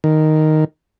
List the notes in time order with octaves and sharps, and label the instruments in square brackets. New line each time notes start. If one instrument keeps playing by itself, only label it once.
[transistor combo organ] D#3